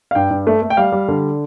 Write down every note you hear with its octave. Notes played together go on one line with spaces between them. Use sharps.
F5
G2 G5
G2
A3
A3
G5
G3 F5
G3
D3